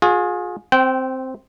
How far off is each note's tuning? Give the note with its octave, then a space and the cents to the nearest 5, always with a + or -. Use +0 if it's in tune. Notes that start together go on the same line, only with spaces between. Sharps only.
F4 +40 G#4 +10
C4 +0 G5 -25